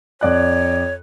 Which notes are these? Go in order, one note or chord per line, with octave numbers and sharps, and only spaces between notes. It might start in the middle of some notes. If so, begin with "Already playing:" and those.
F2 C#5 D5 F#6